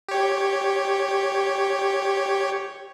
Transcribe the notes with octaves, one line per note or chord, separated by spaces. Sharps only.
G4 C#5